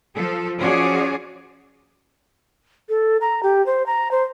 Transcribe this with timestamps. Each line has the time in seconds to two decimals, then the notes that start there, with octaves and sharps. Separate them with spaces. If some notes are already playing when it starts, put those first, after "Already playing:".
0.14 F3 A4
0.59 F3 C#4 F#4 G#4 C#5 D5
2.89 A4
3.21 A#5
3.43 G4
3.66 C5
3.86 A#5
4.11 C5